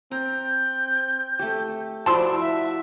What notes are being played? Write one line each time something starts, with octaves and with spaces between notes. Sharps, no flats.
C4 A#5 G6
A3 G4
F3 E4 F#4 D5 A5 C6 E6
E5